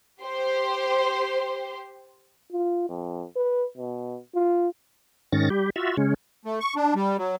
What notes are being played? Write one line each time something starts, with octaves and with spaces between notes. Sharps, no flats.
G4 C5
F4
F2
B4
B2
F4
G#2 D#3 C#4 A6 A#6
G3 G4
F4 F#4 E5
C#3 G#3 C#4
A3
C#6
D4
G3
F#3